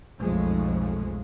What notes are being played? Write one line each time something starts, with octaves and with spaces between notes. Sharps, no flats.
B1 F2 G#2 F3 G#3 A3